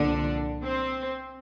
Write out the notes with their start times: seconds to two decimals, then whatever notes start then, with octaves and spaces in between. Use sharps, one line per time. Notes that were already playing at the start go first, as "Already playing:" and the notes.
Already playing: C2 A#2 D3 F3 D4
0.64 C4